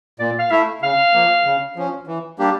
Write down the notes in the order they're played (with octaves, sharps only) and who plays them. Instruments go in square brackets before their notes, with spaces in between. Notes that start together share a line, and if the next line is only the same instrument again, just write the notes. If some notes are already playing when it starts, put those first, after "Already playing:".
[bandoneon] A#2 [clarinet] D5
[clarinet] F5
[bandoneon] A3 E4 [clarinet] E5
[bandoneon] C#3 [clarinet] F5
[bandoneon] F3 A#3
C#3
F3 C#4
E3
G3 A#3 D4 G4